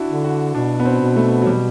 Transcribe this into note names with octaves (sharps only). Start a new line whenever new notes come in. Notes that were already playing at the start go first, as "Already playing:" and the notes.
Already playing: D4 E4 F#4
D3
F#4
B2 D4
B3
C4
B2
A3
F#3
B2 G3